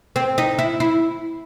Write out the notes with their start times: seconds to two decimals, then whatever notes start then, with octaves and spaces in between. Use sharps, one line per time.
0.16 C4
0.38 D#4
0.59 E4
0.80 E4